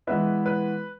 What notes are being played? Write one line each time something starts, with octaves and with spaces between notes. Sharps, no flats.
E3 G#3 B3 E4 B4 E5
B4